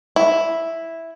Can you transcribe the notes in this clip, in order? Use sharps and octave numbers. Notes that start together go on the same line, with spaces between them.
E4